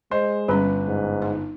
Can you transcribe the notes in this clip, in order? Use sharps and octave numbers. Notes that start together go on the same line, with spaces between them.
G#3 C5 D#5
G1 G3 C#4 B4
G#2
D#4